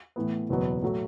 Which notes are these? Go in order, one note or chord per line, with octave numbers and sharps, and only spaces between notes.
A2 E3 B3
F#1 E2 B2 F#3 B3
A2 F#3 A3